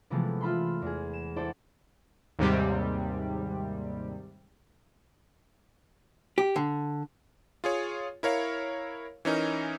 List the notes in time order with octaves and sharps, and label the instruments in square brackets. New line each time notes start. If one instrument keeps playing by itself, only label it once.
[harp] C3 E3 F3 G#3 A3 B3
F4 E5 B5 C6
E2 G#4
E7
E4 A4 C5 D5 F#5
[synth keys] D#2 G#2 C3 G3
[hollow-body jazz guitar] G4
D3
[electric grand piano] F4 G#4 C#5
E4 A#4 C#5 F5
E3 C#4 D#4 A#4